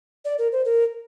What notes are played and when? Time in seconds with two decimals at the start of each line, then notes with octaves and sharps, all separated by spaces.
0.25 D5
0.39 A#4
0.52 C5
0.65 A#4